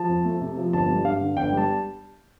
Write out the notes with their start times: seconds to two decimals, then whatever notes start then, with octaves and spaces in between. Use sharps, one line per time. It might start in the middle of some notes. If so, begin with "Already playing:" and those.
Already playing: F3 A5
0.08 F2
0.25 A3
0.41 C3
0.57 F3
0.73 G1 A5
0.88 G3
1.05 G2 F5
1.21 D3
1.37 G1 G5
1.52 G3
1.57 A5